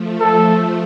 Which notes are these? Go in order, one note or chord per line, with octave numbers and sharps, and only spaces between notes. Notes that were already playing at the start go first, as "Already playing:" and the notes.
Already playing: F3 A3
A4